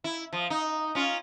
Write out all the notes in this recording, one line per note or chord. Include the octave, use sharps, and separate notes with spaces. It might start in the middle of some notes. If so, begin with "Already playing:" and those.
E4
F3
D#4
C#4 F4